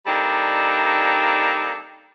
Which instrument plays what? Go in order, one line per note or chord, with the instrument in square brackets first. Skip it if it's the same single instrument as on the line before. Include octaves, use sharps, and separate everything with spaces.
[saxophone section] G3 A#3 C4 D4 D#4 A4